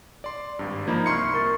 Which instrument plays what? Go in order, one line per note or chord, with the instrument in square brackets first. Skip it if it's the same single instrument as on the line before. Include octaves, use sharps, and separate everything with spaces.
[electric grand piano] D5 C6
G#1 G2
[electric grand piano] F3 A#3 D#4 [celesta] A#5 B5 G#6
[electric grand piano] C2 C6 C#7 [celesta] E5 C#6 F6
[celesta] A#4 C#6 A6